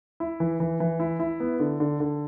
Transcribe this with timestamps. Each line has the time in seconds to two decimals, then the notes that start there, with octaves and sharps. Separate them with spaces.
0.20 E4
0.40 E3
0.60 E3
0.80 E3
1.00 E4
1.20 E4
1.40 B3
1.60 D3
1.80 D3
2.00 D3